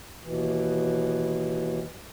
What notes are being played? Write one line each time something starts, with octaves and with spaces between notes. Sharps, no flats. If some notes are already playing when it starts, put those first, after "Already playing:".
D#2 B2 E3